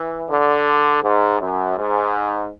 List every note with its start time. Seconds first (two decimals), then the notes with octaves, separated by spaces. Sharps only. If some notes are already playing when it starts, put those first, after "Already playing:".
Already playing: E3
0.29 D3
1.03 G#2
1.41 F#2
1.78 G#2